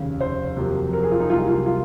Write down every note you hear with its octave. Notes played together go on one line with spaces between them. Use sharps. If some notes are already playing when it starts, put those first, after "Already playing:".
Already playing: F1 D#2 C#3
C5
F2 C3 F#3 A#3
A#4
G#4
F4
D#4
C2 C3 F#3 A#3 F4
F4
F4